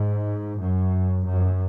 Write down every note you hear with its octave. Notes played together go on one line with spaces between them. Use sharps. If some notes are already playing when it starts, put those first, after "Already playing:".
Already playing: G#2
F#2
F#2